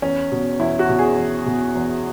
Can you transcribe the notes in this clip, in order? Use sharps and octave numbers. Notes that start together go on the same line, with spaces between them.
E2 C#4
B2
E2 E4
F#4
B2
G#4
E2
B2
E2